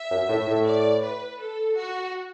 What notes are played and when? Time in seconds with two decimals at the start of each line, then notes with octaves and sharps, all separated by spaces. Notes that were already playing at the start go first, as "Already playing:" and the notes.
Already playing: E5
0.11 F#2
0.29 A2
0.47 A2
0.66 D5
1.02 B4
1.39 A4
1.76 F#4